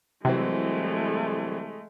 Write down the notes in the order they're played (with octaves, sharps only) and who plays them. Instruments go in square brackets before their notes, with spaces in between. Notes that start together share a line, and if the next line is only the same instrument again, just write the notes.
[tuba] C2 [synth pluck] C3 [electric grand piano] E3 F#3 C4 [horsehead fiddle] G#3 A3